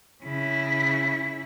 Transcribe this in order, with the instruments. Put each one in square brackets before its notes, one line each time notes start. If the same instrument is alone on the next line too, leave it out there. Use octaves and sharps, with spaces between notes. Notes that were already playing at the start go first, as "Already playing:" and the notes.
[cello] C#3 E4